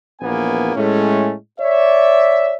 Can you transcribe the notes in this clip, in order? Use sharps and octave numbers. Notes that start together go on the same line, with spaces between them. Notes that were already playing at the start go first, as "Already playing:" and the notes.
A#1 E2 A#3 B3 G#5
A2 G#3 A3 C#4
C#5 D5 E5